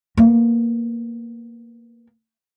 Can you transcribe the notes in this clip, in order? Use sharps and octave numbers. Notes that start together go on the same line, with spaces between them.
A#3 B3